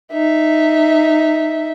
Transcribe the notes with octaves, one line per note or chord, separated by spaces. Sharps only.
D#4 E5